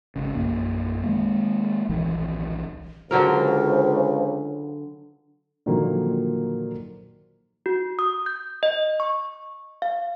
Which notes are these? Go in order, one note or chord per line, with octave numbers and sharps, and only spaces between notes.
G#1 C#3
A#1 F#2 A#3
D#3 G#3 A#3
D1 A#1 D#3 E3
C#2 D3 F#3 A#4 C5
A#2 D3 D#3 F3 F#3 A#3
F#4
D#6
G6
D#5
C#6
F5